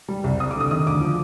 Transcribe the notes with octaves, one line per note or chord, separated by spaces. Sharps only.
G3
C2
C4 D#6
D6
D3 D#6
D#3 D#6
D2 D6
F3